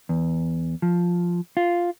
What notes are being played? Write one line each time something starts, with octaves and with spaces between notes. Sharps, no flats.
E2
F3
F4